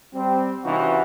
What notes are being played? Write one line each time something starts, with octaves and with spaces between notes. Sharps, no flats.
G3 C4
C3 E3 C#4 D#4 F4 F#4